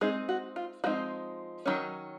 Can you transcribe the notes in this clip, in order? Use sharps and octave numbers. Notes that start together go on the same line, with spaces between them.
G#3 C4 D#4 G#4
F#4
F4
F3 G#3 C4 D#4 F#4
D#3 F#3 C#4